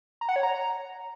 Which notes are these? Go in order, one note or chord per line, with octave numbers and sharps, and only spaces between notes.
A#5
F#5
C#5
A#5